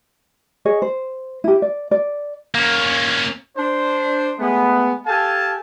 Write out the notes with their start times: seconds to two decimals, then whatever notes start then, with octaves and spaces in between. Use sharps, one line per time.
0.65 G#4 C#5 D#5
0.82 C5
1.44 E4 G4
1.62 D5
1.91 D5
2.55 A#3 C#4
3.57 D4 C5
4.40 G#3 A3 B3
5.07 G4 A4 F5 G#5 A5